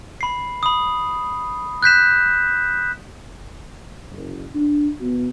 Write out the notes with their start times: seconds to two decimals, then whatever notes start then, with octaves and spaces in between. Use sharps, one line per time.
0.21 B5 C7
0.63 B5 D#6
1.83 F#6 G6 B6 E7
4.10 F#1
4.55 D4
5.00 B2